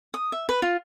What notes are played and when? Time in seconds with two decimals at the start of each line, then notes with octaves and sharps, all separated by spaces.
0.14 D#6
0.32 E5
0.49 B4
0.62 F4